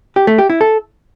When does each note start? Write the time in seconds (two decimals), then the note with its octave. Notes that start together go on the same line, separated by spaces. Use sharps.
0.16 G4
0.27 A3
0.38 G4
0.50 E4
0.61 A4